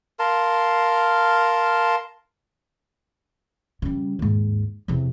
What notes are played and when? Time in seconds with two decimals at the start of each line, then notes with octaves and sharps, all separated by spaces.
0.19 A#4 F5 A5 C6
3.82 C#3 G3
4.19 D#2 G#2
4.88 E2 C3